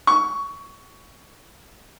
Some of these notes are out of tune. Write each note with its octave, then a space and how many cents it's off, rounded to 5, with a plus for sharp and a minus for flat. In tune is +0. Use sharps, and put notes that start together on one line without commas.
C#6 +15